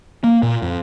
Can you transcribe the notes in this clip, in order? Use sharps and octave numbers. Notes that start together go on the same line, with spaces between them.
A#3
A#2
F2